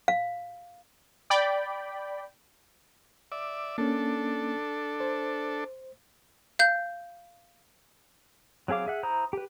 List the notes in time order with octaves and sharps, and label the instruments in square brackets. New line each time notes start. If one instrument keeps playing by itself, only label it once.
[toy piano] F5
[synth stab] D5 G5 B5
[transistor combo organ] D5 E5
[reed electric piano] A#3 C#4 [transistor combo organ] D4 A4
[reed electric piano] C5
[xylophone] F5 G6
[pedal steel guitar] F#3 C4 G#4 F5 D6
G#4 E5 F#5
E4 C5 A#5 D#6
G4 B4